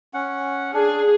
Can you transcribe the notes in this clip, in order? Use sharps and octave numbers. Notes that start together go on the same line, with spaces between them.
C#4 F#5
D4 G#4